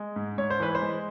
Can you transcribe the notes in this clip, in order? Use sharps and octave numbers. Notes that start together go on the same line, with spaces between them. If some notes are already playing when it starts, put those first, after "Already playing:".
Already playing: G#3
G#2
G#2 C#5
C5
E3 B4
C5
G#3